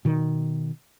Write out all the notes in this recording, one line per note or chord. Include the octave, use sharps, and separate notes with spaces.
B2 D#3